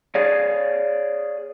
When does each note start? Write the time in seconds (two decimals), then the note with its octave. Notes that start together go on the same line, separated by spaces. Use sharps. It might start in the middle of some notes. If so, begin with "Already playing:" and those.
0.15 G#4 C#5 D5 F5